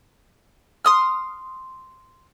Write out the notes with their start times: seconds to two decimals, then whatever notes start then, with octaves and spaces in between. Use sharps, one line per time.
0.85 C6 D#6 F6